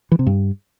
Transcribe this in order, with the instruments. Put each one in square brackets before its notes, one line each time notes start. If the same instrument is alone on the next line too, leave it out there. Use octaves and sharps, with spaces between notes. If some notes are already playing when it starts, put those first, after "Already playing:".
[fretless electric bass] E3
C3
G2